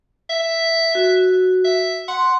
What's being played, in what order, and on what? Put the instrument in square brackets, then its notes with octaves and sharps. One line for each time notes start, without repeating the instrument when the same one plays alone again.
[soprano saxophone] E5
[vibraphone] F#4
[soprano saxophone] E5
[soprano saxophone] F#5 [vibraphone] C6